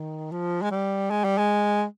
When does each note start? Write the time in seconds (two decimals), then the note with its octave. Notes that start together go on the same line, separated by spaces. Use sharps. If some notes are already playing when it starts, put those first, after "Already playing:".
Already playing: D#3
0.32 F3
0.62 G#3
0.71 G3
1.10 G#3
1.24 G3
1.38 G#3